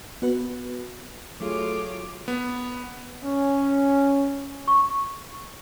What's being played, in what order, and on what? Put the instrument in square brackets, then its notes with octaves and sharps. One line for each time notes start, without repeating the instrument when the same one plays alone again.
[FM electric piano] B3 F#4 B4
[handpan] F#3 G#4 [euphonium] A3 [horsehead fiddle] F4 [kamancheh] C#5 D6
[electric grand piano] B3
[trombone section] C#4
[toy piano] C#6